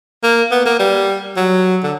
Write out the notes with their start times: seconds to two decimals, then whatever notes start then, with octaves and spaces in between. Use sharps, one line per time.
0.23 A#3
0.51 B3
0.65 A#3
0.79 G3
1.37 F#3
1.83 D3